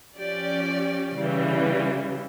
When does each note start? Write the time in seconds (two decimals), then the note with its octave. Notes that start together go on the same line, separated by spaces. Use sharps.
0.17 F3 C#4 G4 D5
1.17 C#3 E3 G3